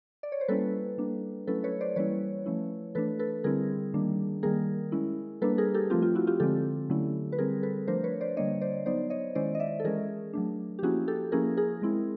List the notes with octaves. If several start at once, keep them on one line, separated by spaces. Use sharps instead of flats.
D5
C#5
C5
G3 A#3 C#4 E4 A4 B4
G3 A#3 D4
F#3 A3 C#4 E4 A4 B4
B4 C#5
C5 D5
E3 G3 A#3 C#4 E4 B4 C#5
F3 A3 C#4 E4
E3 A3 D4 A4 B4
A4 B4
D3 G3 C4 E4 G#4 A#4
D#3 G3 A#3 D4
D#3 G3 A#3 G#4 A#4
G#3 C#4 E4
G3 A#3 D4 A4 B4
G#4 A#4
G4 A4
F3 A3 C4 F4 G4
F4
E4 F#4
F4 G4
D3 F3 G#3 C4 G4 A4
D3 F#3 A3 C#4 E4
B4
D3 G3 C4 G#4 A#4
A4 B4
F3 A3 D4 A#4 C5
B4 C#5
C5 D5
D3 G3 A#3 D4 C#5 D#5
C5 D5
F#3 B3 D#4 C5 D5
C#5 D#5
D#3 G#3 C#4 E4 C5 D5
D#5
D5 E5
A4
E3 G#3 C#4 G#4 A#4
F#3 A3 D4
G4
F3 A#3 C#4 E4 F#4 G#4
G4 A4
F3 A#3 C#4 E4 G#4 A#4
G#4 A#4
G#3 C4 E4